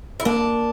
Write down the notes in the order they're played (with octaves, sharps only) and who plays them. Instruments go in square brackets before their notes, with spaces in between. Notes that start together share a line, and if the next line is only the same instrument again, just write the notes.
[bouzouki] E4
[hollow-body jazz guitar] A#3 [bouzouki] D4